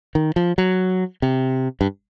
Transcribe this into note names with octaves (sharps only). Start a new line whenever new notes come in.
D#3
F3
F#3
C3
G2